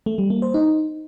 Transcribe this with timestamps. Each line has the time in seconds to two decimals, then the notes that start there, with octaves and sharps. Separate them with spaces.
0.06 A3
0.18 G3
0.30 A#3
0.42 C5
0.54 D#4